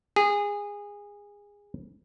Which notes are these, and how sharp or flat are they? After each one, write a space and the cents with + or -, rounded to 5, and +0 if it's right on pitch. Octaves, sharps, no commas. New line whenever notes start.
G#4 -20